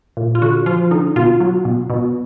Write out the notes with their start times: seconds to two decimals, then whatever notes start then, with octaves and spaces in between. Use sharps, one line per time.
0.17 A#2
0.35 F4
0.42 D3 F#4
0.66 F3 F4
0.91 D3 D#4
1.16 B2 F4
1.40 F#3
1.65 B2
1.90 B2